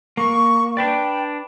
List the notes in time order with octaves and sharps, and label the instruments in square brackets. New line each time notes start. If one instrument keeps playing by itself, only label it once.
[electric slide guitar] A#3 [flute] C#6
[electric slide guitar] D4 B4 D5 [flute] G5